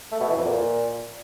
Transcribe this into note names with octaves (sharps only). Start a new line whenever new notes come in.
A3
B2
E3
F2
A#2